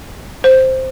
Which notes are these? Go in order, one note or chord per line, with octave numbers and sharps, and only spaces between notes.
C5